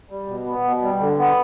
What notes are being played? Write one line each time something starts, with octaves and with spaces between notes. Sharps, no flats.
G3
B2
B3
B2
G3
D3
B3